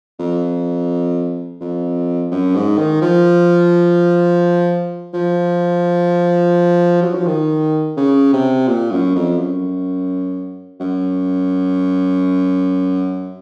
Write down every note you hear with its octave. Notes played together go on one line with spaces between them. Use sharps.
F2
F2
F#2
G#2
D#3
F3
F3
F#3
F3
D#3
C#3
C3
A#2
F#2
F2
F#2
F#2